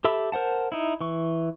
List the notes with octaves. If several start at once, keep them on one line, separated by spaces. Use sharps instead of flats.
G4 A4 E5 B5 E6
A#4 C5 F#5 A5
D#4 E4
E3 C#6